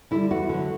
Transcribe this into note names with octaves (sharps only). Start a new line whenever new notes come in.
D3 G3 E4
E2 F#4
D3 F#3